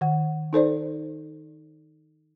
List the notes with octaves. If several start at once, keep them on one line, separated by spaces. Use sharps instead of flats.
D#3 F#5
D#4 A4 C5 D5